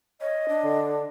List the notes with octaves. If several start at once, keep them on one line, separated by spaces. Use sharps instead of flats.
C#5 D#5
D4
D3